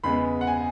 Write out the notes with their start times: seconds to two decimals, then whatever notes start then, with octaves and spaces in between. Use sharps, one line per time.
0.04 E2 C#3 G#3 B3 B5
0.41 F#5
0.47 G#5